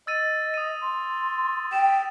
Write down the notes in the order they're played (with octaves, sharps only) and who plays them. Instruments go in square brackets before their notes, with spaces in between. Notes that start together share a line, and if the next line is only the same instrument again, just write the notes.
[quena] D#5 [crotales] E6 A6 D#7
[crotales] D#6 D#7
[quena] C6
[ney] G5 [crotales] E7